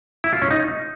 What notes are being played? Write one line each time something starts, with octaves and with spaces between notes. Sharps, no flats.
E4
F4
C#4
D#4